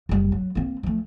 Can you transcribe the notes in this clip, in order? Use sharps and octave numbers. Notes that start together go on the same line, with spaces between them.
F#1 G3
F#3
A#3 C4
F3 A3